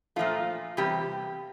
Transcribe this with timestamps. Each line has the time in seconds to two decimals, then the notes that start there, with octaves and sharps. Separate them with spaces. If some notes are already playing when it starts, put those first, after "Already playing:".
0.16 A#2 F3 A3 F4
0.77 E2 C3 G3 G4